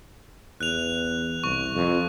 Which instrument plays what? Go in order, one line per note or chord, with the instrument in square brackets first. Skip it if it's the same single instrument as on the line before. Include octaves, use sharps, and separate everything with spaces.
[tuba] E2 [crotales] F#6 F7
[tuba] C2 [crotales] C#6
[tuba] F2